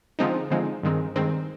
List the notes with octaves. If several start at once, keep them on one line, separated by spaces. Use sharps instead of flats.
D3 F3 G#3 C4 D#4
D3 F3 G#3 C4 D#4
G2 D#3 G#3 C4
G2 D#3 G#3 C4